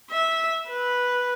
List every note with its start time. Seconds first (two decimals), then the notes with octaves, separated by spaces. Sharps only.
0.10 E5
0.67 B4